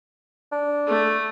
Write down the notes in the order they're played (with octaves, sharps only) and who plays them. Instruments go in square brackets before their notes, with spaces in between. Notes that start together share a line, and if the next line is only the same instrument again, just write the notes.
[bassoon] D4
[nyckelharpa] A3